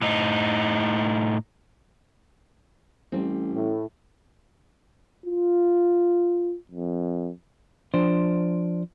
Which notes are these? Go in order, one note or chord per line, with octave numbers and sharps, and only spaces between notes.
A2 D#4
A1 G3 C4
A2
F4
F2
F3 D4 C5